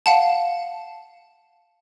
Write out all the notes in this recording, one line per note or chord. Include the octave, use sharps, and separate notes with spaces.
F5 F#5 A5